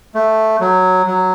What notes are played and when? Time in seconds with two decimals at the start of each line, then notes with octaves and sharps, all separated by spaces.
0.15 A3
0.60 F#3
1.07 F#3